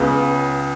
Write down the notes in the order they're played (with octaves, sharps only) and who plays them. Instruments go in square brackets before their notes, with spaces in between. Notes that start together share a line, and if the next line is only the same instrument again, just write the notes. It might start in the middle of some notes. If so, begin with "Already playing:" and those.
Already playing: [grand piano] C#2 C#3 B3